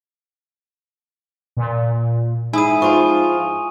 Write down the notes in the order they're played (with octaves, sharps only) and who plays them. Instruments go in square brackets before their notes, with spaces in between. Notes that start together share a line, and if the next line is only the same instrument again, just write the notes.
[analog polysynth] A#2
[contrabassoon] G#2 [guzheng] E4 G#4 [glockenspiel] G#5 D#6 D#7
[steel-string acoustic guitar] F3 F4 [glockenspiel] G#5 C#6